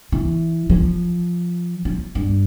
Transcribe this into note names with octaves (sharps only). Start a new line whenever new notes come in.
E3
F3
F3
G2